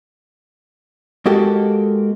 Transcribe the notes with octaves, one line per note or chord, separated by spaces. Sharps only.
G#3 A#3 F#4 G4 A4